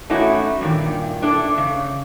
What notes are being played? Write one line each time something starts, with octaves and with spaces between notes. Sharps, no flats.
A3 C#4 D#4 E4 F#4
G2 A#2 D#3
D4 E4 A4 D5
C#3